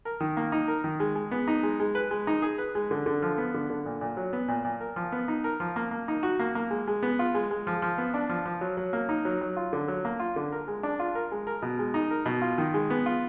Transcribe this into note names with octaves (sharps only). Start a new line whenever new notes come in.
A#4
D#3
A#3
D#4
A#4
D#3
G#3
G#3
B3
D#4
G#3
G#3
B4
G#3
D#4
G#4
B4
G#3
D3
D3
F3
B3
D3
D3
A#2
A#2
F#3
B3
A#2
A#2
A#4
F3
B3
D#4
A#4
F3
A#3
A#3
D#4
F#4
A#3
A#3
G#3
G#3
B3
F4
G#3
G#3
F3
F3
B3
D4
F3
F3
F#3
F#3
A#3
D#4
F#3
F#3
F4
D3
F#3
A#3
F4
D3
A#4
G#3
D4
F4
A#4
G#3
A#4
B2
G#3
D#4
A#4
B2
F4
D#3
G#3
B3
F4